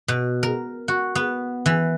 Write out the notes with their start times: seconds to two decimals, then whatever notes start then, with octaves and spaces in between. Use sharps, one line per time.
0.08 B2
0.43 A#4
0.88 F#4
1.15 B3
1.66 E3